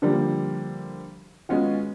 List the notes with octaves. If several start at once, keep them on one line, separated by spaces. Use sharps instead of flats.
D3 F3 G3 A#3
G#3 B3 C#4 F4 F#4